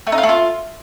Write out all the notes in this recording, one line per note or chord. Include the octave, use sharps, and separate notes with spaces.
A3
D#4
F4
A3
F4